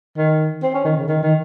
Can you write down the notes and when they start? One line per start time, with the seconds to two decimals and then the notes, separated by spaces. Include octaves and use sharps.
0.17 D#3
0.63 C4
0.74 C#4
0.84 D#3
0.96 C#3
1.08 D#3
1.23 D#3